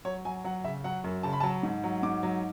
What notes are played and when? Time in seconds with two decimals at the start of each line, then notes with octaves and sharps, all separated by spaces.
0.05 F#3 C#5
0.25 F#3 G#5
0.44 F#3 F#5
0.64 C#3 E5
0.84 F#3 F#5
1.04 F#2
1.23 C#3 A5
1.33 B5
1.40 A5
1.43 F#3
1.63 G#2
1.84 F#3
2.03 G#2 D6
2.23 F#3